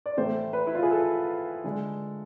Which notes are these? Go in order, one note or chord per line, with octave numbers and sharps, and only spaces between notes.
D5
A2 E3 A3 C5
B4
E4
F4
G#4
A4
D3 G#3